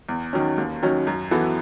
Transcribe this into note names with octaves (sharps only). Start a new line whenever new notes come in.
E2
D#3 F#3 C#4
D#2
D#3 F#3 C#4
F#2
E3 B3 F#4 A4